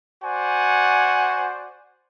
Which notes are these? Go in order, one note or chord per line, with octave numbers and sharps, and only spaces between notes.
F#4 C5 D5 F#5 G#5